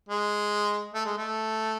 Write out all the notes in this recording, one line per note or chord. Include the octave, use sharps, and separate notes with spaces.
G#3
A3
G#3
A3